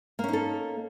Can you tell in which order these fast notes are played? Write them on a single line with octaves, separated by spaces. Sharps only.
A#3 C#4 D#4 A4